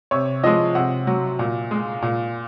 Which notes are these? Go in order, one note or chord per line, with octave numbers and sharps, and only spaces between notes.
C3 C#5
F3 G#3 D#5
C3 F#5
F#3
A#2
G#3
A#2